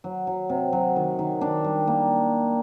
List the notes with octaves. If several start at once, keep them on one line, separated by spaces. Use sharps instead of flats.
F#3
F#3
C3
F#3
D#3
D#3
D4
G3
A#3